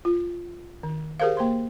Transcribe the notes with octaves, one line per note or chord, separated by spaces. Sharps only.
F4
D#3
G4 G#4 A#4 C5 F5
A#3 C5 C6